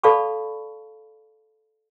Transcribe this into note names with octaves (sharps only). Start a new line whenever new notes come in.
A4 D5 F5 A5 B5 C#6